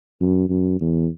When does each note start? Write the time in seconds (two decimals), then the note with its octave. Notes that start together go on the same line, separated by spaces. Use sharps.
0.20 F#2
0.49 F#2
0.81 E2